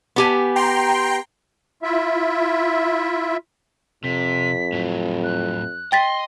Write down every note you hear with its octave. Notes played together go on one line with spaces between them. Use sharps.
B3 G4 G#5
G5 A#5 C6
E4 F4 E5
F2 C3 B6
A2 F#3
F#6
D#5 G5 C6 A6 B6